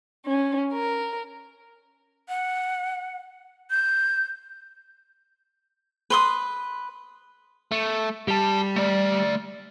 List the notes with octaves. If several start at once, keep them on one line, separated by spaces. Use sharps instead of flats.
C#4
A#4
F#5
G6
B4 C6 D#6
A3
G3 G4 A5
A3 D5